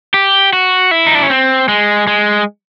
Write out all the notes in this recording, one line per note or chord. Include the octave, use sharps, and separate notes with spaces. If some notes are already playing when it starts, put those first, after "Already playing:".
G4
F#4
E4
D#4
D4
C#4
C4
G#3
G#3